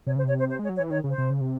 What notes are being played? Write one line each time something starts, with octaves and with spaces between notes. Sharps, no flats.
C3 C#5
C#3 C5
C3 C#5
C5
C5
G#3 C#5
F#3
C#5
E3
D#3 C#5
C#3
C5
C3
C#3
C3